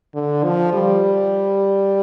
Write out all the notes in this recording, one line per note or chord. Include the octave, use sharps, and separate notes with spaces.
D3
F3
G3